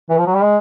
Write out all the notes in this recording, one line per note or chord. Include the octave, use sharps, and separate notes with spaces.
E3
F3
F#3
G3
G#3